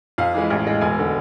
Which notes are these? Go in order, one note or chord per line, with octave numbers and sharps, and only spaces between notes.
F2 F5
E3 G#3
A1
A2 G#3
E1 G#5
D3